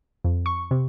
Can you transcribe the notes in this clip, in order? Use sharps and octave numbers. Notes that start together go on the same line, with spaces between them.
F2
C#6
C3